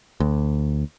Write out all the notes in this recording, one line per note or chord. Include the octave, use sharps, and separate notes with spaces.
D2